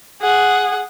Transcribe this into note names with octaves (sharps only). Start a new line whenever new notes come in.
G#4 F#5